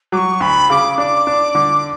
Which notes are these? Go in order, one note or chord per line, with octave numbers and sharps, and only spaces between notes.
F#3 C#6 D6
D2 B5
C#3 D6
D4 D6
D4
D3